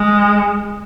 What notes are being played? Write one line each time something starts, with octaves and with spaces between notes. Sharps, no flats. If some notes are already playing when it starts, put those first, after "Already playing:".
Already playing: G#3